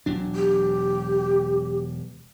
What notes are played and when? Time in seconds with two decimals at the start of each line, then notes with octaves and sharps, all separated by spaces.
0.06 E1 F#3 D4
0.36 G4